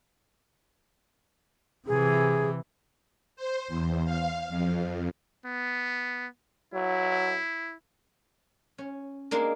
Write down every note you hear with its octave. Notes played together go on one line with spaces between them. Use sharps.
C3 E3 G#4
C5
E2
F5
F2
B3
F#3 E4
C#4
G#3 A#3 D4 A#4